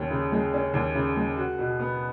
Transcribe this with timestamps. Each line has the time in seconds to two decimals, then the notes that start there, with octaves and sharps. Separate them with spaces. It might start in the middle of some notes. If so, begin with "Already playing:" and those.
Already playing: D#2 C#4
0.10 C#3
0.32 G#3
0.53 C#4
0.74 D#2
0.95 C#3
1.16 G#3
1.37 F#4
1.58 B2
1.79 B3